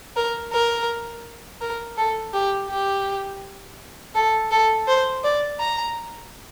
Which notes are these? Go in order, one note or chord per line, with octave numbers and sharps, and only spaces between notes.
A#4
A#4
A#4
A4
G4
G4
A4
A4
C5
D5
A#5